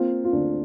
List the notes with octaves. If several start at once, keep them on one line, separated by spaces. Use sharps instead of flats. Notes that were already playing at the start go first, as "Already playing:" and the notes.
Already playing: A#3 C4 F4
F4
D2 D4